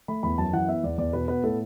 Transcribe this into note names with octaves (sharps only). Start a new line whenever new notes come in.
A3 B5
E2 B5
F#2 A5
E3 F#5
B3 E5
E2 D5
E2 D5
B2 B4
B3 B4
A2 A4